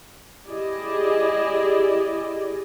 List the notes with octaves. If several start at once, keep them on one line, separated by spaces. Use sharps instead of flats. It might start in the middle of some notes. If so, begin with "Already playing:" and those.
E4 G4 G#4 D5 D#5